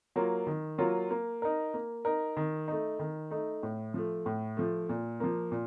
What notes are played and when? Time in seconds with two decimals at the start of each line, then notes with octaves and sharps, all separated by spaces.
0.16 F#3 A#3 F4
0.47 D#3
0.78 F#3 A#3 F4
1.10 A#3
1.42 D#4 A#4
1.74 A#3
2.05 D#4 A#4
2.37 D#3
2.68 A3 D#4
2.99 D#3
3.31 A3 D#4
3.63 A2
3.94 F3 A3
4.26 A2
4.57 F3 A3
4.89 A#2
5.20 F3 A#3
5.52 A#2